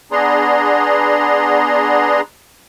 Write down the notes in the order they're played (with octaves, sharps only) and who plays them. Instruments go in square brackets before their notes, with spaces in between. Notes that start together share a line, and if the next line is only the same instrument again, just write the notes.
[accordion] B3 D4 G#4 A#5 C6